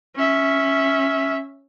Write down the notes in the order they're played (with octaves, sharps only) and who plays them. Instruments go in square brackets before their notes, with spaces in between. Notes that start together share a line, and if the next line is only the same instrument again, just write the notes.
[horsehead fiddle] C#4 E5